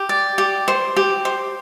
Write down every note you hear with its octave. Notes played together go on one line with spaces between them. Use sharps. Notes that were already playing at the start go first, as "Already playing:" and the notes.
Already playing: G4
D5
G4
C5
G4
C5